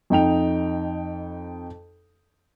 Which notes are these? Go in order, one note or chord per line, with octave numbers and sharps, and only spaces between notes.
F2 D#4 G5 F7